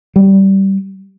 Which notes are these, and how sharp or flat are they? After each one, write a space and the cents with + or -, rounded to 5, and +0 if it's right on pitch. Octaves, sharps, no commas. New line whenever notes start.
G3 -15